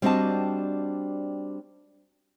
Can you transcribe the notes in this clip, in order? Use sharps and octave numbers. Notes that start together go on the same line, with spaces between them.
G3 C4 D4 F#4 D#5 A5